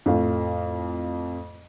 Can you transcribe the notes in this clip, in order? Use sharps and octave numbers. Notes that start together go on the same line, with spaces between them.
F2 A2 A3 F5